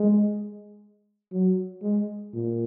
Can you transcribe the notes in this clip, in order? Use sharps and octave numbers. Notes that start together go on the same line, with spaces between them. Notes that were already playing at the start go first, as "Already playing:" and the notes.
Already playing: G#3
F#3
G#3
A#2